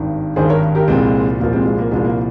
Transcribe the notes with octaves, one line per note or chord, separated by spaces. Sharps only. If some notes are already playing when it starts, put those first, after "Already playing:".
Already playing: G#1 G2 D#3
G#1 G2 D#3 G#4 C5
A#4 C#5
G4 A#4
C2 A#2 F3 G#3 C4
C2 A#2 F3 A#3
G#3 C4
G#3
A#3
C2 A#2 F3 G#3
A#3